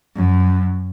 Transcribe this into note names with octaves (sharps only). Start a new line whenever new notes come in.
F#2